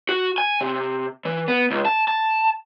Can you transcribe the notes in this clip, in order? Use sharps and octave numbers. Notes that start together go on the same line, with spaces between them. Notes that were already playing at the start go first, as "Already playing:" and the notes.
F#4
G#5
C3
E3
B3
C#2
A5
A5